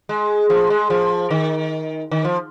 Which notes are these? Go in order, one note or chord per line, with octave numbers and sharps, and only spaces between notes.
G#3
F3
G#3
F3
D#3
D#3
F3